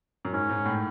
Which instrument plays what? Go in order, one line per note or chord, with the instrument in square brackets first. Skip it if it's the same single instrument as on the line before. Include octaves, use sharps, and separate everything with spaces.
[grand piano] F#2
[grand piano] G#2 [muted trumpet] C#4
[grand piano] G#2
A2